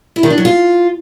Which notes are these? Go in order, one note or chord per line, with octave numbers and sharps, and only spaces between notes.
E4
D#3
D4
F#3
F4